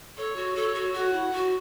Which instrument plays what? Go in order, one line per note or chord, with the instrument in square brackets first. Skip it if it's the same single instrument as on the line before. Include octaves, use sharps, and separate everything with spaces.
[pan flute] A4 [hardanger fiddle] C#5
[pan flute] F#4
[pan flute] A4 [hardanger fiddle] C#5
[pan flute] F#4
[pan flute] F#4 [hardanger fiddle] F#5
[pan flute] E4
F#4